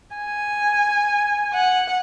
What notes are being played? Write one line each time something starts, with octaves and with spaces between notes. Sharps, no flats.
G#5
F#5